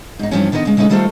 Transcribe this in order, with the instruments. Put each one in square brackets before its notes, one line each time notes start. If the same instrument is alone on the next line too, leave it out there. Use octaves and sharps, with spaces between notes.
[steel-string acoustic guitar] G#2 D#4
G2 E3 F3 C4 C#4
D3 D#3 B3 B4 D#5
C#3 G#3
C#3 G#3 A3 D#4 B4
D#3 G3 A3 F4 A4 C5